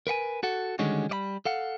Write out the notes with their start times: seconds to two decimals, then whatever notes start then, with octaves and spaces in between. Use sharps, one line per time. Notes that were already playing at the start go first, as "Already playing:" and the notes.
0.07 A#4 B4 F#5 G#5
0.43 F#4 A4 F#5
0.79 D3 D#3 G3 G#3 C#4 F#4
1.09 G3 D5 B5
1.45 A4 F5 F#5